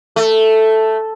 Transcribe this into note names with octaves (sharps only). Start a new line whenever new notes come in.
A3